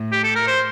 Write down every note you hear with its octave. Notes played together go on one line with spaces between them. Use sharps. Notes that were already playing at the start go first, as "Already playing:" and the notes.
Already playing: A2
G4
A4
A#4
C5